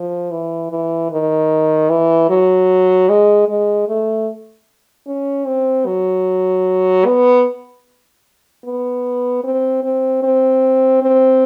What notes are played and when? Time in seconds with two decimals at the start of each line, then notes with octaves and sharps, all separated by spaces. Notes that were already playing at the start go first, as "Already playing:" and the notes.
Already playing: F3
0.31 E3
0.70 E3
1.10 D#3
1.89 E3
2.29 F#3
3.09 G#3
3.48 G#3
3.88 A3
5.07 C#4
5.46 C4
5.86 F#3
7.06 B3
8.64 B3
9.44 C4
9.83 C4
10.23 C4
11.02 C4